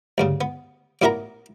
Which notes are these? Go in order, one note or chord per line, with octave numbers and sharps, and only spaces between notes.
D2 G2 C#3
B3
A1 A#2 B3 E4 A#4 A#5